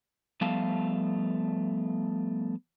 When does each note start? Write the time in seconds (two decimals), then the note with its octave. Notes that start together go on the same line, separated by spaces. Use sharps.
0.41 F3 G3 A3 B3 F5 A5